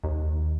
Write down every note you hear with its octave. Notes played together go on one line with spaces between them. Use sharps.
D#2